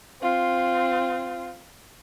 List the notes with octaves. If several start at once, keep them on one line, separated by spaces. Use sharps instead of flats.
C4 F4